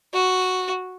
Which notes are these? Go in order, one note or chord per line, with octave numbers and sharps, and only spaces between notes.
F#4